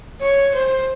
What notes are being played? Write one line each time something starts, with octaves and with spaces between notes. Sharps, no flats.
C#5
C5